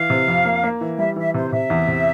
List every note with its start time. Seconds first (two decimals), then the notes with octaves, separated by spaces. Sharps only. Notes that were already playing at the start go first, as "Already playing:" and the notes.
Already playing: E3 F5
0.10 C3
0.28 F2
0.45 A#3
0.63 A#3
0.81 E3
0.98 G3 E5
1.16 E3 E5
1.34 C3 C5
1.52 C3 E5
1.70 E2
1.87 C3